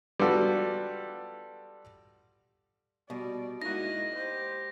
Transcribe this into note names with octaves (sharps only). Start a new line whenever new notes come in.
G3 B3 F4 F#4 A4
B2 G3 D5
G#3 A#3 D#4 E4 F#4 D#5 A#6
G4 C5